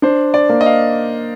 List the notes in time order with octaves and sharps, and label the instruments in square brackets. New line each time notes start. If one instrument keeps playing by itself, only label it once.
[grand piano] D4 C5
D5
A#3
D#5
F5